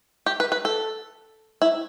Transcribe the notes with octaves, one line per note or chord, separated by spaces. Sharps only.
G4
B4
B4
A4
E4